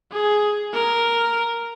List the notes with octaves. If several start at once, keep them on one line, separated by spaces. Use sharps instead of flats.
G#4
A#4